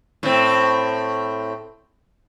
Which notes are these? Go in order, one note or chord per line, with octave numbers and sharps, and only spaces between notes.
A2 C4